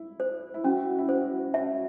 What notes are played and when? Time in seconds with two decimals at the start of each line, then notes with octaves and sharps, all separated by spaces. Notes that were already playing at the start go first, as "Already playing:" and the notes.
Already playing: E4
0.20 C5
0.54 E4
0.64 C#4 F#4
0.99 E4
1.09 F#4 C5
1.54 C#4 E5